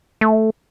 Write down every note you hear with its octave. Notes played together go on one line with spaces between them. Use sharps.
A3